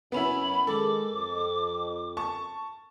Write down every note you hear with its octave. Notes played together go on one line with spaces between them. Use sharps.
F#2 B3 C#4 E4 B5
D#3 G#3 A4 D6
F2
A5 C#6